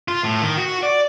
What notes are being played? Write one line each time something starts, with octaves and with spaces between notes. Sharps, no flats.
F4
A2
D#3
F#4
D5